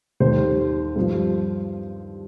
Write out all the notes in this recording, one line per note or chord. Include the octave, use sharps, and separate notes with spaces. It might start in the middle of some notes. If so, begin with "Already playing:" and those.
D#2 D#3 G3 C5
G2 F3